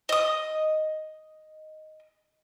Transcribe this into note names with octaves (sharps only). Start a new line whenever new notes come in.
D#5 D#6